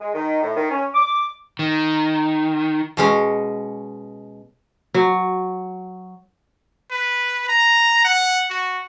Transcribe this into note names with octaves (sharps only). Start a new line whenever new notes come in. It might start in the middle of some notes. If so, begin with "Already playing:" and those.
G#3
D#3
A2
D#3
C#4
D6
D#3
B2 G#3 C#4
F#3
B4
A#5
F#5
F#4